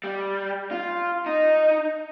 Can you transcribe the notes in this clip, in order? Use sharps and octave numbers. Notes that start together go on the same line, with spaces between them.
G3
F4
D#4